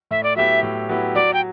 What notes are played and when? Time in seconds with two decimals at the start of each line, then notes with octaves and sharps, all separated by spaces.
0.11 A2 E5
0.23 D5
0.36 F#3 B3 E4 G4 E5
0.63 A2
0.89 F#3 B3 E4 G4
1.15 F#3 D5
1.34 G5